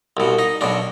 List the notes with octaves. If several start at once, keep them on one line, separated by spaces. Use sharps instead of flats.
C2 B2
D#4
B1 B2 D4